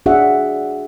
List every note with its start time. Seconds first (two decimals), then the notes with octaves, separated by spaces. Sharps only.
0.06 D4 F#4 G#4 C#5 E5 F#5